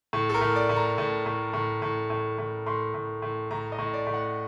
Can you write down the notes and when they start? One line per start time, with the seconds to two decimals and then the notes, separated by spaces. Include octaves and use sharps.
0.13 A2
0.29 A4
0.34 A#4
0.41 A2
0.56 D5
0.69 A2
0.76 A#5
0.98 A2
1.26 A2
1.53 A2
1.82 A2
2.10 A2
2.38 A2
2.66 A2 C6
2.94 A2
3.22 A2
3.51 A2 A#5
3.72 D#5
3.79 A2
3.94 D5
4.07 A2
4.14 F#5